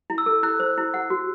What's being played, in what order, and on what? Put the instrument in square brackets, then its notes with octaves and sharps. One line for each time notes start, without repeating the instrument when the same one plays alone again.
[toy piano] E4
[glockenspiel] E6
[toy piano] A4
[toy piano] E4 [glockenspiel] F#6
[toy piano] C5
E4
F#5
F#4